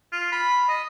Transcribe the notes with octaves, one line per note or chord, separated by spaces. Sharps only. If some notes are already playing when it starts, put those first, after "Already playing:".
F4
B5
D#5